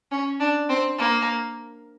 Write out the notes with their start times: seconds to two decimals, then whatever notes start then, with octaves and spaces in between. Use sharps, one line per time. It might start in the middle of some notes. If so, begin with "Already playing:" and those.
0.11 C#4
0.40 D4
0.69 C4
0.99 A#3